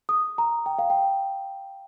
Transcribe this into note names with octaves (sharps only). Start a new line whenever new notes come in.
D#6
A#5
G5
F5
G5